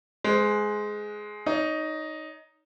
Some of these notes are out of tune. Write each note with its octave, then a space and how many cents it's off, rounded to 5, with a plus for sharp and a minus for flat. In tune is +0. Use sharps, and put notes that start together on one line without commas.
G#3 +10 C5 -35
D#4 +0 C#5 +30